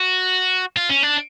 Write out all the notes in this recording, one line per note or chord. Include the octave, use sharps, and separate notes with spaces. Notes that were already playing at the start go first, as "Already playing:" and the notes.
Already playing: F#4
F4
C#4
D4